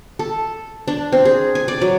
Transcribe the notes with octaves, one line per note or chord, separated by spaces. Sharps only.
A4
D4
C4
G#4
G#5
D5
F#3